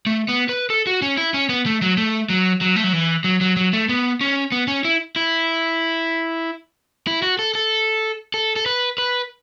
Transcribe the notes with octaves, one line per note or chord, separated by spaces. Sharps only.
A3
B3
B4
A4
F#4
C#4
E4
C#4
B3
A3
F#3
A3
F#3
F#3
A3
F#3
E3
F#3
F#3
F#3
A3
B3
C#4
B3
C#4
E4
E4
E4
F#4
A4
A4
A4
A4
B4
B4